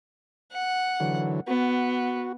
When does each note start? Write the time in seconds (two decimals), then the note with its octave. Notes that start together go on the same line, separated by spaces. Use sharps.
0.52 F#5
1.00 D3 E3 F#3
1.48 B3 F#4